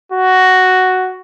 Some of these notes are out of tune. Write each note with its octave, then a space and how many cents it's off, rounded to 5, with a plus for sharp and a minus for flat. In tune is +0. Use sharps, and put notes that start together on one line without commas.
F#4 +5